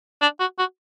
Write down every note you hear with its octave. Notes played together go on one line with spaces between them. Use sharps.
D4
F#4
F#4